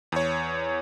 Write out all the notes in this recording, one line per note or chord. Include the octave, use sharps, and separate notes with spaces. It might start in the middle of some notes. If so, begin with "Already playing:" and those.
E2 C#5